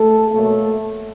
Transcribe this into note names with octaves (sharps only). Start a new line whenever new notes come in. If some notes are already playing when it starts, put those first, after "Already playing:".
Already playing: A3 A4
B2 F#3 A3 A#3 A4